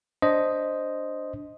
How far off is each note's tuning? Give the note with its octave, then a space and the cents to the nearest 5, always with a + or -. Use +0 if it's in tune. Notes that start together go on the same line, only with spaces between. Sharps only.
D4 -5 C5 +0 D#5 +0